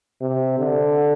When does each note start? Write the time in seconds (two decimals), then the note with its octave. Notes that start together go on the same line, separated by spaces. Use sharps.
0.22 C3
0.58 D3